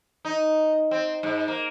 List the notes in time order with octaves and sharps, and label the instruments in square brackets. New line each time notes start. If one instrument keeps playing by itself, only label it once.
[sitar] D#4
C4
G#2
A#3